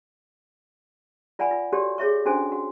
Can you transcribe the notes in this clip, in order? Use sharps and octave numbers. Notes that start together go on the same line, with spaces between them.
F4 D5 F#5 G#5 B5
F4
F#4 G4 A4 C#5 D5
G#4 C#5 E5 C#6
C#4 D4 F#4 A4 C5 G#5
F#4